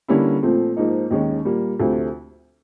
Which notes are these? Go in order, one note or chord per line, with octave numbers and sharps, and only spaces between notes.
D3 G3 A#3 C#4 E4
A#2 F3 A3 C4
G#2 F3 A#3 D#4
D#2 D#3 G#3 C#4
A#2 G3 A#3
D2 C3 F3 A3